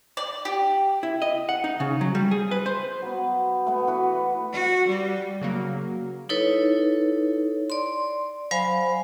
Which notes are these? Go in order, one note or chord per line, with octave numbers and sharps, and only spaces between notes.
D5
G4
E4
D#5
F#5
D#4
C#3
F#3
G3
G#4
B4
C5
F#3 B3
A3 B3
E3 F#4 B4
F#4
G3
C#3 F#3 A#3
D#4 E4 A4 B4 C#5
D5 C6
F#3 C5 F5 G#5 B5